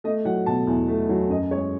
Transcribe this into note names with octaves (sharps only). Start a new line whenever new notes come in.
A3 D#5
F#3 F#5
B2 A5
E2
A3
F#3
F#2 D#5
G#3 C#5